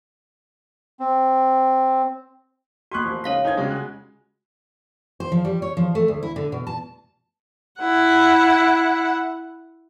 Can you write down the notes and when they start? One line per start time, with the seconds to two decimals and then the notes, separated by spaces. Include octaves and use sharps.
1.00 C4
2.92 A#3 F#4 C6 C#6 F#6
3.04 A1 F3
3.24 C#3 G#3 D#4 C#5 F5 B6
3.44 D4 D#4 C5 G#5 G#6
3.57 C#3 F#3 G#3 F4 G4
3.71 F#4 G#5 F#6
5.20 C5
5.32 F3
5.45 G3
5.62 C#5
5.77 F3
5.95 A3
6.08 D2
6.23 E4
6.36 D3
6.52 B2
6.67 A5
7.81 E4 F#5